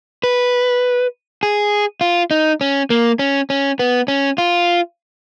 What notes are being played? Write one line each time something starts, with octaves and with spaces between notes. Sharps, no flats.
B4
G#4
F4
D#4
C#4
A#3
C#4
C#4
B3
C#4
F4